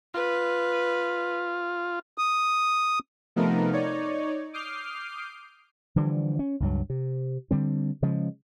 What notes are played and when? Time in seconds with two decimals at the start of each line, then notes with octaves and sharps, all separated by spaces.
0.14 F4 B4
2.18 D#6
3.36 C3 F3 A3 B3 D#4 A#4
3.73 D#4 C#5 D5
4.53 D6 D#6 F6 G6 C7
5.96 D3 E3 F3 G3
6.39 C#4
6.60 C#2 G2 F#3
6.90 C3
7.51 D3 G3 C4
8.02 C#3 F3 G#3